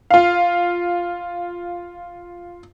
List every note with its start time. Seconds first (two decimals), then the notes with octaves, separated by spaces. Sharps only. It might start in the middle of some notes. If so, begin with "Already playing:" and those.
0.11 F4 F5